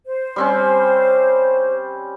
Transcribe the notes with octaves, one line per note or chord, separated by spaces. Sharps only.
C5
G3 C4 C#4